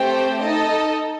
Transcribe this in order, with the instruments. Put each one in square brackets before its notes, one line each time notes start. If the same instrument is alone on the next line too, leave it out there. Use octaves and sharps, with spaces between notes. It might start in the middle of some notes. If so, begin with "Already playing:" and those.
Already playing: [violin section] A3 C4 G4 C5 G5
D#4 A4 D#5